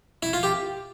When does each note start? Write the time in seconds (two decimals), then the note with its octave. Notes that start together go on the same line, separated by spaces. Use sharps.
0.23 E4
0.33 F4
0.43 G4